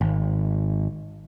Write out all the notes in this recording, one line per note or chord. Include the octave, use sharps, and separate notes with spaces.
G#1